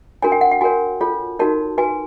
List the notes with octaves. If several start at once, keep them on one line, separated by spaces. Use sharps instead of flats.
D4 F#4 A#4 C#5 G#5
G5
F#5
G5
F#4 A#4 C#5 G#5
F4 A4 C#5
D#4 F#4 A#4 C#5 A5
F#4 B4 G#5